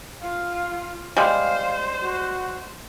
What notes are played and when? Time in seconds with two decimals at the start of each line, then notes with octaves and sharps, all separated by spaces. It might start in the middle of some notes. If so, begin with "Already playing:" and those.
0.21 F4 F5
1.17 G3 G#3 C5 F5
2.01 F#4